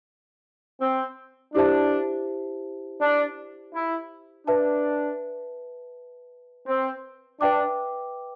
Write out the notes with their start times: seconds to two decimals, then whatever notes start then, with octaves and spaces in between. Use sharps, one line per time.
0.81 C4
1.54 D4 E4 G4 C5 E5 A5
3.01 D4
3.74 E4
4.47 D4 B4 E5 A5
6.67 C4
7.41 D4 B4 E5 G5 D6